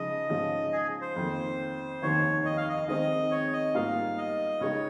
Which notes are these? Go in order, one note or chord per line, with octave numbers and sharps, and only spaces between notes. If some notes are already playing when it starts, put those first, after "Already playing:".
Already playing: C#3 F3 G#3 D#4 D#5
G#2 F3 G#3 C#4 F4
G#4
C5
F2 D#3 A#3
F1 D#2 D#3 A#3 C#5
D#5
F5
D#5
D#3 G#3 C4 D#4 G#4 D#5
C#5
D#5
G#2 G3 A#3 F4 A#4 F5
D#5
C#2 C#3 G#3 D#4 C#5